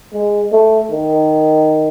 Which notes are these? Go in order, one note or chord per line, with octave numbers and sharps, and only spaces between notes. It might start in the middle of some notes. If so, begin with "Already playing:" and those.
G#3
A3
D#3